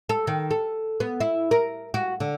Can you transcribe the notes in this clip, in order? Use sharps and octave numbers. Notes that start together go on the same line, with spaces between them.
A4
D#3
A4
B3
E4
A#4
F#4
D3